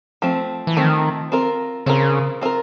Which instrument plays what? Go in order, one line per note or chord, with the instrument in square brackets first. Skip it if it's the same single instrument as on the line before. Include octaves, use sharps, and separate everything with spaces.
[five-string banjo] F3 A3 C4
[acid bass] E3
[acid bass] D#3 [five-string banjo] F3 A3 C4
[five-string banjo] C4 F4 A#4
[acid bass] C#3 [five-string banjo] C4 F4 A#4
[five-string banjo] C4 F4 A#4